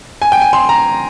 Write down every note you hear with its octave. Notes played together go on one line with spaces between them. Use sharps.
G#5
G5
G#5
C6
A#5